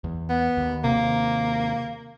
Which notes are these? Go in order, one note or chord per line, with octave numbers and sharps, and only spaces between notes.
E2
B3
D#2
D#2 C3 A#3